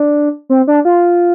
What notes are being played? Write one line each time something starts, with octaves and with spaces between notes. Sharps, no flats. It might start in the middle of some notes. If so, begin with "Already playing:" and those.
Already playing: D4
C4
D4
F4